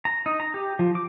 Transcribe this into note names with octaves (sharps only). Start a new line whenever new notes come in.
A#5
D#4
A#5
G4
F3
D6